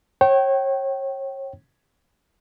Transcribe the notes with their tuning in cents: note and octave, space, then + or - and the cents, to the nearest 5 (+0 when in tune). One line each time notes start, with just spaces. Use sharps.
C#5 -30 G5 -30